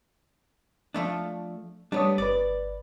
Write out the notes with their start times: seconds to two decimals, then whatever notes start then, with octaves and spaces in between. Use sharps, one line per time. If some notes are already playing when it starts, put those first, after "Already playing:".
0.94 F3 A3 D4
1.92 G3 A3 B3 D4 C#5 D#6
2.18 G1 B4 D5